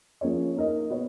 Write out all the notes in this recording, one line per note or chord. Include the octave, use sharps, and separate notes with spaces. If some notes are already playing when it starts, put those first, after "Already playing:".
F3 A#3 C#4 G#4 C#5
A#3 D#4 A#4 D#5
B3 F#4 C#5